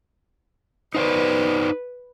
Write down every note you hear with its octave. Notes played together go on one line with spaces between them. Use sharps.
D#4 B4 C5 D5